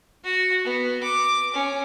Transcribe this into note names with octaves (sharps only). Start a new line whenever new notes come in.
F#4
B3
D6
C#4